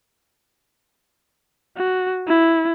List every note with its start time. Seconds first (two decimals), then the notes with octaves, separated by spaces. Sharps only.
1.78 F#4
2.28 E4